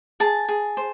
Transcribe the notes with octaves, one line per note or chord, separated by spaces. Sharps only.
G#4 A5
G#4
C5